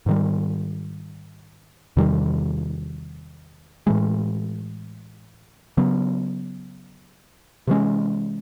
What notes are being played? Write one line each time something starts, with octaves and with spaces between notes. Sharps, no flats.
G#2 D#3 G3
E2 C3 D#3 G3
A2 E3 G#3
C#3 F#3 B3
C3 E3 G#3 C#4